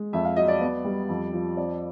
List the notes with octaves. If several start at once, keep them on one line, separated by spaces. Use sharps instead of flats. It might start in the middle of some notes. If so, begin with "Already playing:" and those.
Already playing: G#3
F2 E5
F5
F#3 D#5
D5
B3
G3
F2
F3
C4 D5